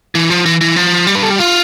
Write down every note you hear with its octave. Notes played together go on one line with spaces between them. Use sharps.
E3
F3
E3
E3
F3
G3
B4
A4
G4
F4